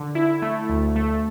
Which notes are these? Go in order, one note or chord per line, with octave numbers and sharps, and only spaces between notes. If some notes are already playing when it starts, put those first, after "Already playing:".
Already playing: D3
E4
A3
D2
A3